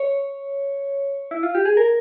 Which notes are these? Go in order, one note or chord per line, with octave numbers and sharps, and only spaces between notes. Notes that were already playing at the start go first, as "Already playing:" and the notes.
Already playing: C#5
E4
F4
G4
G#4
A#4